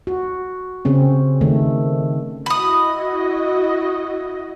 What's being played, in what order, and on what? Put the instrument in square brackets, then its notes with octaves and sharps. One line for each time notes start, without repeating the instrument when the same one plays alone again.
[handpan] F#4
C#3 C4 C#4
D#3 A3
[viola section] E4 F#4 D#5 [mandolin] B5 D#6